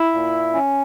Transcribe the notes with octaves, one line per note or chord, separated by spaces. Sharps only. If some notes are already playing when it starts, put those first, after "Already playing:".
Already playing: E4 E5
A#2
C#4